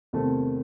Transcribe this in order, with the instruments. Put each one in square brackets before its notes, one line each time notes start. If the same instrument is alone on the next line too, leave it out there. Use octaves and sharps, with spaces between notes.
[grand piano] E2 C3 D#3 A3 C4